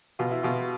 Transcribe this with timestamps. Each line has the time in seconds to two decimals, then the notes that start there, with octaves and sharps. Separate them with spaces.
0.19 B2 F4
0.31 E4
0.43 B2 F4